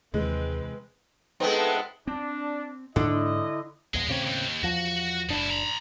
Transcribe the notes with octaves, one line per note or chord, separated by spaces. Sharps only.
D#2 C3 E3 G#3 C4 B4
G#3 B3 C4 D#4 A4 B4
E5 F#5 A5
C4 D4
G#2 D3 E4 D#5
A#1 E2 G#4 D#5
A2 C#3 C4 G4 C#5
D#2
E2 F3 F#4
F#1 B2 D4 E4
A#5 B5